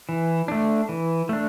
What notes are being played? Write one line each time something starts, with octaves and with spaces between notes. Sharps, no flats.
E3
A3 D4
E3
A3 D4